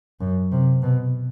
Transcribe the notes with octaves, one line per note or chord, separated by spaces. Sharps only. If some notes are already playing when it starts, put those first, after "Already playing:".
F#2
C3
B2